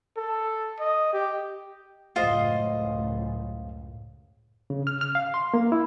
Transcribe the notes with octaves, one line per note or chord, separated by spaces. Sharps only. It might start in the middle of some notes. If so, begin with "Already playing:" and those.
A4
D#5
G4
C#2 F#2 A2 F4 C5 D#5
C#3
F6
F6
F5
C6
A#3
E4